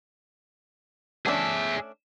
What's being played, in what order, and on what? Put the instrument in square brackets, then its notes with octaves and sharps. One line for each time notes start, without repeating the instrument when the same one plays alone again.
[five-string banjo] A3 C#4 D4 [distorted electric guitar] G#4 E5